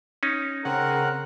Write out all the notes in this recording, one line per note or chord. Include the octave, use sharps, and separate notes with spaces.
C#4 D#4
C#3 C4 A#4 F#5 F#6